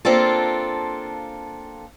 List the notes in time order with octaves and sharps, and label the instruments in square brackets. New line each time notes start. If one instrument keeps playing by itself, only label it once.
[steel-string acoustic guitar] A#3 C4 D4 F4 A4